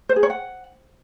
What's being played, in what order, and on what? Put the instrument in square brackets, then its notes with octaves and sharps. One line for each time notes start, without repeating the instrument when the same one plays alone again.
[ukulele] C5
G#4
C#5
F#5